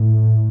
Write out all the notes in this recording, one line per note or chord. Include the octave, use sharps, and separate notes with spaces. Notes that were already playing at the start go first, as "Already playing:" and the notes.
Already playing: A2